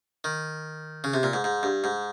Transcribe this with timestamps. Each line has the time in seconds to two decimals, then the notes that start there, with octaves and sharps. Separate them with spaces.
0.24 D#3
1.04 C#3
1.14 C3
1.23 A#2
1.33 G#2
1.44 G#2
1.63 G2
1.84 G#2